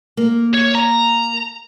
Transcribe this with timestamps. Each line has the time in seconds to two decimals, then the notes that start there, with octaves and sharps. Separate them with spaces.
0.17 A#3
0.54 C#5
0.75 A#5